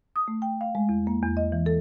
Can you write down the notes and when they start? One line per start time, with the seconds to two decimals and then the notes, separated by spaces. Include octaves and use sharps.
0.16 D#6
0.28 A3
0.42 G5
0.61 F5
0.75 G#3
0.89 E2
1.07 A#3
1.23 E2
1.37 D#5
1.52 E3
1.66 A4